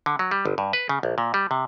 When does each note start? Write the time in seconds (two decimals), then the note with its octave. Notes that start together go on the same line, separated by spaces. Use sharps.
0.06 D3
0.19 F#3
0.31 G3
0.45 G1
0.58 G2
0.73 B4
0.89 C#3
1.03 A#1
1.18 A#2
1.34 G3
1.51 C3